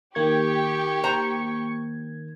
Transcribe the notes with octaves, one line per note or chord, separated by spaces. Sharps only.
D#3 A#3 G4 C#6 G#6
C5 A#5